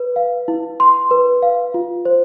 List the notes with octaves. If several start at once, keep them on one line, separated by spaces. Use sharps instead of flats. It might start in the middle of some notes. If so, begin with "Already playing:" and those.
Already playing: B4
F5
E4
C6
B4
F5
F4
C5